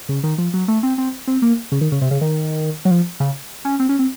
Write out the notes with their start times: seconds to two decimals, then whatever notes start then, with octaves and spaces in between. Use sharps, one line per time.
0.09 C#3
0.23 D#3
0.38 F3
0.53 F#3
0.68 A3
0.83 C4
0.98 C4
1.27 C4
1.42 A#3
1.72 C#3
1.81 D#3
1.92 C#3
2.01 C3
2.11 C#3
2.21 D#3
2.85 F#3
2.91 F3
3.20 C#3
3.65 C#4
3.79 C4
3.89 C#4
3.99 C4